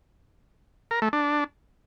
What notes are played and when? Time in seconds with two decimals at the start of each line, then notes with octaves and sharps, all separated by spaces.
0.91 A#4
1.02 A3
1.13 D4